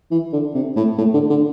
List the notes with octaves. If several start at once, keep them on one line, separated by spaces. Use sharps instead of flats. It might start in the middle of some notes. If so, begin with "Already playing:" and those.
E3
D3
C3
A2
A2
D3
D3